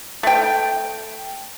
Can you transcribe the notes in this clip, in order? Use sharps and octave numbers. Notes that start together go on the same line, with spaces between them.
A3 G5